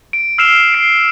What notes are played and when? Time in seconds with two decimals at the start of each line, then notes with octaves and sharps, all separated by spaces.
0.13 D7
0.38 E6 F6 C7 D7 E7 F7
0.72 C7 D7